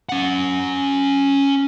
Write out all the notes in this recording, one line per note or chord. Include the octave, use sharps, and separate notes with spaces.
C#4 F#5